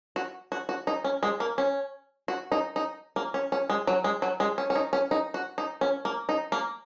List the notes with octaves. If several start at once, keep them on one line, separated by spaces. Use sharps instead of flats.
F#4
F#4
F#4
D#4
C#4
G#3
A#3
C#4
F#4
D#4
D#4
A#3
C#4
C#4
G#3
F#3
G#3
F#3
G#3
C#4
C#4
D#4
C#4
D#4
F#4
D#4
C#4
A#3
D#4
A#3